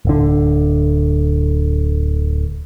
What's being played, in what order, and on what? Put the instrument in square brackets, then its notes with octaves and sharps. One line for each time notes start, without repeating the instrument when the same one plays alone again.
[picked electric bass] D1 D3